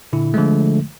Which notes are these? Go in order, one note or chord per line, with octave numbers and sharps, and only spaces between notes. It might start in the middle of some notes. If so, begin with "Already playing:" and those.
A#2 D3 E4
D3 F3 G#3 A3